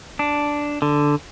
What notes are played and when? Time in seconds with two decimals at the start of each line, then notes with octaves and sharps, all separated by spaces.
0.19 D4
0.82 D3